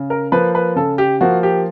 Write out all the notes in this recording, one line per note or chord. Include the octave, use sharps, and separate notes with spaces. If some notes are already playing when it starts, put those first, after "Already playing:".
Already playing: C#3
A#4
F3 A#3 B4
B4
C#3 A4
G4
F3 A#3 F#4
G4